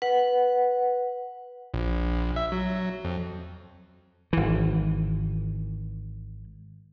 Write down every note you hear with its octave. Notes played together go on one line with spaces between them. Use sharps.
B4 F#5
A#1
E5
F#3
F2
G#1 E3